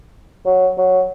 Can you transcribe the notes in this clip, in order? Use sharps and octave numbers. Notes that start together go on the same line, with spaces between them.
F#3
F#3